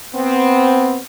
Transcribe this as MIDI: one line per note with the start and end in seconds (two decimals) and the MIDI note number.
0.15 0.99 59
0.15 0.99 60